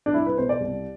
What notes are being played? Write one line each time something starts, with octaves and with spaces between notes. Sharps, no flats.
D4
C2 E4
B4
B2 C5
D5
C2